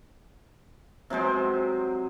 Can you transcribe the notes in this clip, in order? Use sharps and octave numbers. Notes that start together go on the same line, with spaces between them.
C3 F#3 G#3 C5